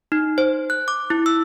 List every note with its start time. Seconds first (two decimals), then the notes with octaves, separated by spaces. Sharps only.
0.12 D#4
0.38 C5
0.70 F#6
0.88 D6
1.10 E4
1.26 E6